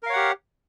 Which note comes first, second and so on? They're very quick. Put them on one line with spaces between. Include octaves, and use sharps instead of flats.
A#4 F5 C#5 F#5 G4